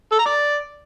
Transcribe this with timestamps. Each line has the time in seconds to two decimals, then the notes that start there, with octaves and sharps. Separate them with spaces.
0.12 A4
0.19 A#5
0.26 D5